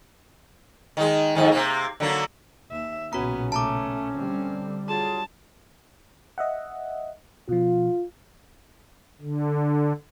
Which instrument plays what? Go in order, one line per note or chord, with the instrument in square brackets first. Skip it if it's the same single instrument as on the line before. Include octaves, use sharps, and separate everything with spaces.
[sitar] D#3 G#3
F2 G#2 D#3
C3 A#3
D3 F#3 A#3
[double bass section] D#2 [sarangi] E5
[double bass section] B1 A#2 C#3 [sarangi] B3 [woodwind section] C#4 [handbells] F#4 A#5
[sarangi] A3 [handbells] A5 A#5 D6
[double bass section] D3 G3 [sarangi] C4
[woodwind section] F#3 F4 G#4 [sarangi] A5
[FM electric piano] D#5 E5 F#5
[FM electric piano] B2 F3 [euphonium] F4
[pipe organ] D3